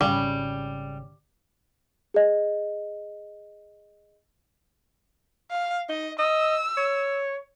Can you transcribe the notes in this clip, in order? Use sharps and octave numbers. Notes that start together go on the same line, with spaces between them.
G#1 C#3 G3
G#4 D#5
F5
D#4 D#5
D#5 E6
C#5